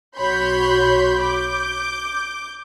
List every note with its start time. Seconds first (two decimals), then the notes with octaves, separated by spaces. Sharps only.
0.17 B1 F#4 C#5 B5 C6 G6
1.22 D6 G6